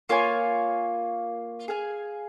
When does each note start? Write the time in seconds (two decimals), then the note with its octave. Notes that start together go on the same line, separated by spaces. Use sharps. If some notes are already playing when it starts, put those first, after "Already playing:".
0.09 A#3 F4 C#5 G#5
1.68 G#4 F5 G#5